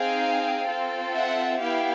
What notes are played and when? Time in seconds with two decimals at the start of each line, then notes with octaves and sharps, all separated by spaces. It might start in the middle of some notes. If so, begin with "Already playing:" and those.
Already playing: C4 D#4 G#4 F5 G5
0.68 C4 F4 A4
1.14 E5 F#5
1.59 B3 E4 G4 F5 G5